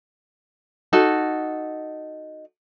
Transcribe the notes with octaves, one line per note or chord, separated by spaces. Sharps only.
D#4 F#4 A4